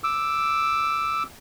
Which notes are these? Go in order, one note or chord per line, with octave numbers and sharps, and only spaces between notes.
D6 E6